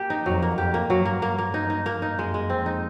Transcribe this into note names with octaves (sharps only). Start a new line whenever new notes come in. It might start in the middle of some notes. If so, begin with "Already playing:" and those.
Already playing: A#3 G4
D#4
F2 F#3
A#3
F2 G4
A#3
G2 F#3
A#3
A#3
A#3
D#4
D#4
A#3
D#4
F#2 G#3
G#3
F2 C4
D#4